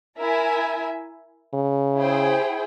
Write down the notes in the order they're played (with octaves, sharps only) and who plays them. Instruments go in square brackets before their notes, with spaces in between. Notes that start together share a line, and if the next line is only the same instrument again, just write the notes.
[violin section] E4 A#4 E5 G#5
[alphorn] C#3
[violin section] E4 G#4 C5 G5